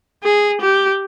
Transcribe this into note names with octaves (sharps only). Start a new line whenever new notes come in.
G#4
G4